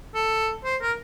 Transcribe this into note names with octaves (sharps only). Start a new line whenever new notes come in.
A4
C5
A#4